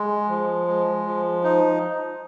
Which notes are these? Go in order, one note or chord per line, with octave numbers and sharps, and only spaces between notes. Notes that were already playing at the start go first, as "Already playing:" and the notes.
Already playing: G#3
F3
G#3
F3
D#4